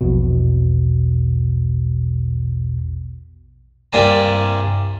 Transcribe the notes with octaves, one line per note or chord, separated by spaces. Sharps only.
A#1 E2 B2
C2 G2 A#3 D5 G#5 A#5